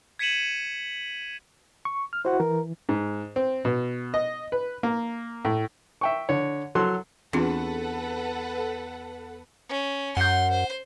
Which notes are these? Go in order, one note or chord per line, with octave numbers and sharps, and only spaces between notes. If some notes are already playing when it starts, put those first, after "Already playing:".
G#6 B6 C#7 D#7 E7 F#7
C#6
F6
E4 F#4 C5 F#5
E3 A#4
G#2
C4
B2
D#5
B4
A#3
A2
E5 G5 C#6
D3 C#5
F#3 A4 C6
E2 C4 D4 F4 A4 B4 F#5
C#4
F#2 F#5 C6 G6
C5